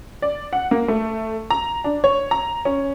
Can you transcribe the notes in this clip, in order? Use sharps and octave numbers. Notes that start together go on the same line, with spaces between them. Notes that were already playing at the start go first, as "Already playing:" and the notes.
D5
F#5
A#3
A3
A#5
D4
C#5
A#5
C#4